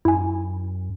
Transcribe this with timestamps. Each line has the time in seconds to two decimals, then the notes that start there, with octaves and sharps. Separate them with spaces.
0.05 F#2 E4 G#5